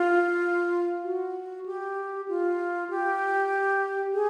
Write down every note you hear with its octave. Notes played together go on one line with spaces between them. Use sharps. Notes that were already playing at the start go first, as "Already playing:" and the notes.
Already playing: F4
F#4
G4
F4
G4
G#4